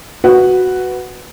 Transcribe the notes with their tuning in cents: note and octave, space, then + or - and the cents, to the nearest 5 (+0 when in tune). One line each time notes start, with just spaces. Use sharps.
F#4 +0 B4 +0 F#5 +0